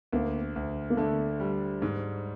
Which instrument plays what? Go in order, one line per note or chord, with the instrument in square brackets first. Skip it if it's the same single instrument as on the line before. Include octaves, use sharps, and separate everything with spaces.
[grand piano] D2 [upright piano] A#3
[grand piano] D2
[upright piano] A#3
[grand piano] D3 [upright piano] A3
[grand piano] G3
G#2